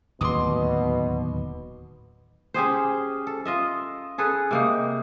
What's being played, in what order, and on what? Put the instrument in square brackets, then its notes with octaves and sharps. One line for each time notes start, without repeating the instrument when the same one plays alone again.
[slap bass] D1 D#2 [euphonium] B2 [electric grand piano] C6 D6 D#6
[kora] C#4 G4 G#4 C5
A4
F4 D#5 E5
C#4 G#4 A4 B4
C3 A#3 D#4